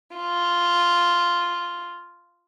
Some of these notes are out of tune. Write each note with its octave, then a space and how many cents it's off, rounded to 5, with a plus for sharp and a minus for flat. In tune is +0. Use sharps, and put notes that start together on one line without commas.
F4 -5